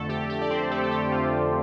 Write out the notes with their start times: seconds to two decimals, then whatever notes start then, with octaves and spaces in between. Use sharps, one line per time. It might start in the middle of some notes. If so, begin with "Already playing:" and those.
Already playing: F2 D3 A3 A4
0.09 G4
0.30 G4
0.41 D5
0.51 C4 C5
0.71 A3 A4
0.84 A4
0.91 G4
1.12 F4